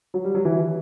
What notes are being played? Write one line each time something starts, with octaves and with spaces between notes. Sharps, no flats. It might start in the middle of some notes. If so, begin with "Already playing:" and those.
F#3
G3
F#3
E3